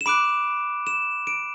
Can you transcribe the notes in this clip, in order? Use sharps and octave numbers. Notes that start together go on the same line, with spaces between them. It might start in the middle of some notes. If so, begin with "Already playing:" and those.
E7
B5 D6 F#6 D7
E7
D7